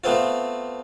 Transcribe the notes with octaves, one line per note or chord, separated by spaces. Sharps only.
A3 B3 C4 F4